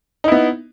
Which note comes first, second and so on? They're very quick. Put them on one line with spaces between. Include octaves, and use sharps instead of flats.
D#4 E4 B3